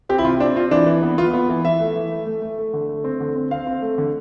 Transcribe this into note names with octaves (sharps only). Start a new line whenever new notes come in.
C4 G4
E4
C3 F4
C4 D4
C4 F4
E3 D4
E3
B3
B3 F4
B3
E3
E3 E5
A3
E3
A3
A3
A3
A3
D3
A3
C4
D3
C4
C4 F5
C4
A3
D3